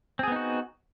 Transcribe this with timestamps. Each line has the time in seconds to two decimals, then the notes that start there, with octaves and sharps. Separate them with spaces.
0.19 C4
0.23 G#4
0.28 B3
0.32 D#4
0.36 F#4